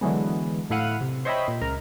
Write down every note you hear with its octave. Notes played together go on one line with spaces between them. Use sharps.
D3 E3 F#3 G#3 B3
A2 A3 E4 F5 F#5 D#7
C3
C5 C#5 D#5 E5 G5 B5
A#2
C#2 A#4